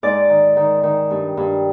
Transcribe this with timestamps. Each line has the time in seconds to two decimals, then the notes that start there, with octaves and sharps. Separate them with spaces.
0.03 G#2 D5
0.30 D#3
0.57 D#3
0.83 D#3
1.10 G2
1.37 G2